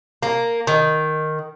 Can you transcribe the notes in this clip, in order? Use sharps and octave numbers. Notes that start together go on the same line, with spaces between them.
A#3
D#3